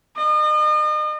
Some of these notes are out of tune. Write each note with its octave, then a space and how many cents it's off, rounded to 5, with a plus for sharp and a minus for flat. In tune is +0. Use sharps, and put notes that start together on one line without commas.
D#5 -40